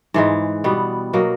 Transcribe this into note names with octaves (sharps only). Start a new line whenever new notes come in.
G#2 E3 G#3
B2 G3 B3
B2 F#3 A#3